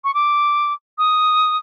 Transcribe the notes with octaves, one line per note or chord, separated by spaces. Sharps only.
C#6
D6
D#6